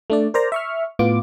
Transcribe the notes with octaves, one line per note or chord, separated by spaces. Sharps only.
A3 D4 D5
A#4 C5 D5 A#5
E5 C#6 F6
A2 B3 F4 D6